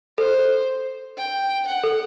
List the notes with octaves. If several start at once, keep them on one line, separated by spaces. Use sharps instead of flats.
A4 C5
G5
F#5
A4